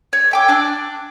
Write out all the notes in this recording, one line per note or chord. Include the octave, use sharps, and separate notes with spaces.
C#5
E5 G5 D6
D4 D6 F#6